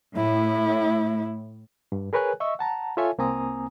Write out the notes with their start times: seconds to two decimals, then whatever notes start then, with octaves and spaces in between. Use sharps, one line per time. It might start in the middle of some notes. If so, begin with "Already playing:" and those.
0.16 A2 E4
1.92 G2
2.13 G#4 A#4 B4 C#5 G#5 F#6
2.40 D#5 E5 C#6 E6
2.59 F#5 A5 A#5
2.97 F4 A4 C#5 E5 G#5
3.18 C2 A#3 C4 G#5 A#5 D#6